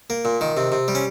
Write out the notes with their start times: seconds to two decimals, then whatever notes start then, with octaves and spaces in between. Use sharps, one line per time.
0.10 A#3
0.25 A#2
0.41 D#3
0.57 C3
0.72 C3
0.88 G3
0.95 C#4